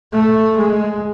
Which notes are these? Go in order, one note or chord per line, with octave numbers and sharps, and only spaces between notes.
A3
G#3